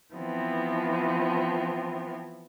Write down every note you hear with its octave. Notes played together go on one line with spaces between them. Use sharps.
E3 F3 B3 C4